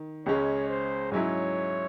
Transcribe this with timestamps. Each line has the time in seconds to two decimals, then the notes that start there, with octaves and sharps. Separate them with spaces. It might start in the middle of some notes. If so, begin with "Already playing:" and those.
Already playing: D#3
0.26 C#2 C#3 G#3 C#4 C#5
0.69 C5
1.12 G#2 F#3 C#4 E4 C#5